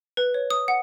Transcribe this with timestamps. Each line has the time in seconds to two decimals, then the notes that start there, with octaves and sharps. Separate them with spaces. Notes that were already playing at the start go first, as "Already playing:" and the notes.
0.17 B4
0.34 C#5
0.50 D#6
0.68 F#5